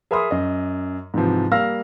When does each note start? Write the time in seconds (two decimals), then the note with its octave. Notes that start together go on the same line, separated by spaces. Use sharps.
0.11 G#4 A#4 E5 B5 C6 D#6
0.31 F#2 D#5
1.14 G#2 C3 E3 F3
1.51 G3 A#3 F5 E6 F6 A#6